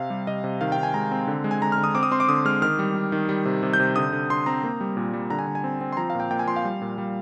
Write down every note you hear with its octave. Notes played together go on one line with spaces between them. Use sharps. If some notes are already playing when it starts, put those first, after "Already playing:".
Already playing: C3 F5
G3
C3 D#5
C3
D#3 F5
G5
D#3
G#5
G#3 A#5
C4
D3
G#3
G#5
D3 A#5
F6
D3
D#6
C4 D6
D#6
C4 C6
D6
D3 D#6
G#3 F6
D#3 F6
G3
D#3
D#3
G3
C3
C3
G6
C3
D3 D#6
D3
D3 C6
C4 A#5
A#3
G3
A#2
G3
D3 A#5
G#5
D3
G#5
C4
C4
C6
F3 A#5
A#2 F5
G5
A#2 G5
G#5
F3 C6
F5
G3
A#2
G3